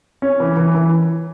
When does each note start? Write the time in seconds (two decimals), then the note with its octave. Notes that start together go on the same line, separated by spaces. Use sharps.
0.22 C#4
0.40 E3
0.57 E3
0.75 E3